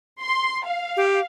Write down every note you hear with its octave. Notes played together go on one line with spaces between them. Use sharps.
C6
F5
G4